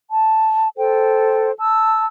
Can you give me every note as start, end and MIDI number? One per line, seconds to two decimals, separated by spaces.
0.11 0.68 81
0.77 1.50 69
0.77 1.50 72
0.77 1.50 79
1.57 2.06 81
1.57 2.06 88